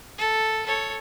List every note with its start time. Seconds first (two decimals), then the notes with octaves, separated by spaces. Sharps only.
0.18 A4
0.65 A4 C#5